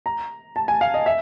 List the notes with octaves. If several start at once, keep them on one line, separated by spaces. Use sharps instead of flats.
A#5
A5
G#5
F5
D#5
E5